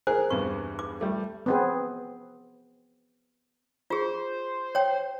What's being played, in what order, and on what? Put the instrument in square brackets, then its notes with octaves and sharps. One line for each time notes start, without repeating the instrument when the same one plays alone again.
[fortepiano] G#4 A#4 G#5 [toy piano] C5
[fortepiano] E2 G2 B3 [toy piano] C#6
[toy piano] D6
[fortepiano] G3 A3
[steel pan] B3 C4 G#4
[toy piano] F4 G#4 [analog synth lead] C5
[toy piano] C#5 G5